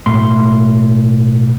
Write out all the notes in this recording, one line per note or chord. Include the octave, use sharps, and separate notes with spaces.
B1 A2 C6